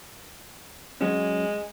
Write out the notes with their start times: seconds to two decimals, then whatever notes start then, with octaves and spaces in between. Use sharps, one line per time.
1.01 F#3 G#3 C#4